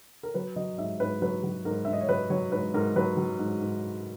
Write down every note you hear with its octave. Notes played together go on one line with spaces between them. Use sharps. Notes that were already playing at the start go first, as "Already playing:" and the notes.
A#4
F#3 B4
F#3 D#5
G#2 E5
G#2 B4
F#3 B4
F#3
G#2 A#4
G#2 E5
D#5
C#5
F#3 B4
F#3 C#5
G#2 B4
G#2 A#4
F#3 B4
F#3
G#2
G#2